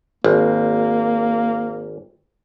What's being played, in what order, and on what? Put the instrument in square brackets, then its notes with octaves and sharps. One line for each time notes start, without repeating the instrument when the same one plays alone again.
[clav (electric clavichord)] G#1 [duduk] A#3